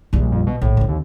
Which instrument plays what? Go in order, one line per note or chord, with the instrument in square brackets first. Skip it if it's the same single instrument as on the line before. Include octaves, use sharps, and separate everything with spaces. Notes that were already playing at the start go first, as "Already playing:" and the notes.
[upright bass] A#1 G3
[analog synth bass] F2
B2
[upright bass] A#1 [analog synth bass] A2
[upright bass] D3 C4
[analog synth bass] D#2